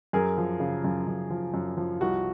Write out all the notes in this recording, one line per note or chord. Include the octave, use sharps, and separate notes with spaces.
F#2 G#4 A#4
F3
C#3
F#2
F#2
F3
F#2
F3
C2 F#4